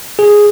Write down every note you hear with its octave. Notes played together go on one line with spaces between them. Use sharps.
G#4